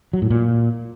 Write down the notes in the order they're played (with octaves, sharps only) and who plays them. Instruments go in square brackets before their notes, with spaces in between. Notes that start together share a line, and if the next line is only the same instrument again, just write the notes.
[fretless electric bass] F#3
A2
A#2